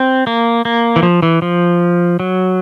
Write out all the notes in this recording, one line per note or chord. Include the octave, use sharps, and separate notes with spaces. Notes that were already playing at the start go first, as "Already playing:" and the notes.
Already playing: C4
A#3
A#3
E3
F3
E3
F3
F#3